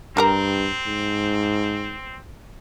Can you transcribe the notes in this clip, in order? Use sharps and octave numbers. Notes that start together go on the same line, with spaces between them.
G2 G3 C4 A#4 A#5
G#2